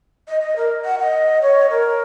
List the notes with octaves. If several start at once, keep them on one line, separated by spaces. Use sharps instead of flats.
D#5
D#5
A#4
F#5
D#5
C#5
A#4